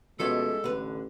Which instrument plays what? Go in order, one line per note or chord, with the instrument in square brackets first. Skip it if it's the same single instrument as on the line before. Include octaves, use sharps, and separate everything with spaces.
[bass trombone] B2 [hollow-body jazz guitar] F3 A3 C#4 [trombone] G#3 [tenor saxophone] A4
[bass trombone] A1 [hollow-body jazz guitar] D3 B4